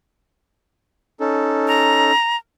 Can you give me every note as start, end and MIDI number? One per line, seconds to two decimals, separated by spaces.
1.20 2.11 61
1.20 2.11 63
1.20 2.11 69
1.68 2.37 82